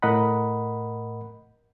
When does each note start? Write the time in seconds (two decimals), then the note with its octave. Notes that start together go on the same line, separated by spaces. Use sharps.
0.02 A2 A#4 D#5 F#5 B5